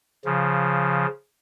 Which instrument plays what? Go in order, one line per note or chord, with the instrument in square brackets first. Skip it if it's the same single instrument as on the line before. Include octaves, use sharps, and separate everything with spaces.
[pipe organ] C#3 F3